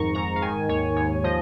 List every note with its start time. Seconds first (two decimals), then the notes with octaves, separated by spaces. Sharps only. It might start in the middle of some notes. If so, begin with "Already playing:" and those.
Already playing: F2 G#2 D#3 A#5 C#6
0.15 G#2 A#5
0.36 F5
0.42 D#3 G#5
0.69 D#2 C#5
0.96 D#2 C#5
1.24 F3 D#5